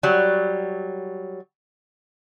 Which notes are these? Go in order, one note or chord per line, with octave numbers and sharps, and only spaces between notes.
F#3 G3